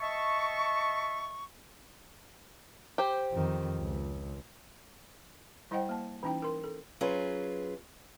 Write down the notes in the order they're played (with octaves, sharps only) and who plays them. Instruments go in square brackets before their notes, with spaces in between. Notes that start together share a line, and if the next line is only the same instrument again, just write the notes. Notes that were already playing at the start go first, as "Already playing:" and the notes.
[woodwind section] D#5 E5 A5 C#6
[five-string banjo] G4 C5
[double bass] F2 D#3
C#2
[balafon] G3 E4 C5 D#5 F#5 G5
A#3 A5
E3 C#4 D#4 E4 G5
A#4 C6
A4
[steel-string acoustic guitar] F#3 C#4 F4 G#4 B4